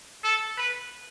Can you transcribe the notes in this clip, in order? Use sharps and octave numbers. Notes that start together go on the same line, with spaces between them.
A4
B4